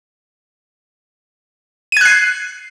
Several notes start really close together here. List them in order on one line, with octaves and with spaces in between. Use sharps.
D#7 G#6 F#6 C7